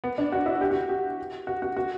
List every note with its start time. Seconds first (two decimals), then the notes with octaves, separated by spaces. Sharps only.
0.04 B3
0.18 D4
0.32 F#4
0.46 E4
0.61 G4
0.71 F#4
0.89 G4
1.47 F#4
1.62 F#4
1.77 F#4